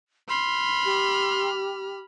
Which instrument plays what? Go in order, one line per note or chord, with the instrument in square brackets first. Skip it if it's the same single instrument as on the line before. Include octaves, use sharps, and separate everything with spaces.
[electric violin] B5 F6 [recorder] C6
[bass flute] G4